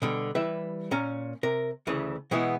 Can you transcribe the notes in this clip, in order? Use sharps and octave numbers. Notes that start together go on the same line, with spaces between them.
B2 D3 G3
E3 G3 E4 B4 E5
A#2 C#4 A#5
C3 A#4
D2 C#3 E3 B4
B2 E3 G#3 B3 E4